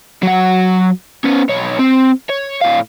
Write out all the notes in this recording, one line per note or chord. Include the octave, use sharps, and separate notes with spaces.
F#3 F#5
B3 C#4
B1 C#5
C4
C#5
A2 F5